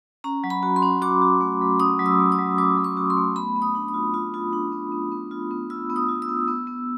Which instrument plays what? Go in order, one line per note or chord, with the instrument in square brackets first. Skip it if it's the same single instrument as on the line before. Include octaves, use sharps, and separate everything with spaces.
[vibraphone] C#4 A#5
F#3
B5
F#4
C6
C#4
F#4 D6
F#4
A3
F#3
C#4 D#6
F#3
E6
A3
D#6
F#3
F#3 D6
F#3
C#6
F#4
C6
A3
B3 B5
B3
D#6
D4
D#6
F4
F4
F4
D4
B3
B3
B3
F4
B3
F4 E6
B3
D#6
F4
E6
B3
B3
B3